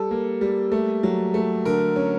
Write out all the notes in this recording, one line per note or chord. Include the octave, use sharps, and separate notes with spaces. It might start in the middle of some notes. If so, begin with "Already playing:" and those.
Already playing: G3 A4
A#3
G3
A3
F#3
A3
D3 A#4
C#4